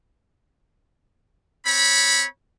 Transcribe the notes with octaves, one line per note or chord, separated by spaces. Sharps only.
C4 C#5 B5